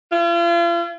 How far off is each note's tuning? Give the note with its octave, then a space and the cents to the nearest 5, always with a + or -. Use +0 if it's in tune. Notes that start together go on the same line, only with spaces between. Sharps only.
F4 -40